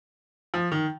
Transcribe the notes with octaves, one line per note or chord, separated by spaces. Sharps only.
F3
D#3